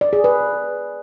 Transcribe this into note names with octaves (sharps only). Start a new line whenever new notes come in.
D5
G#4
B4